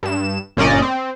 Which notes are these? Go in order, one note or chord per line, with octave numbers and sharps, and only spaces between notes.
G2 E7
G1 A#2 C#4 D5 D#5
C4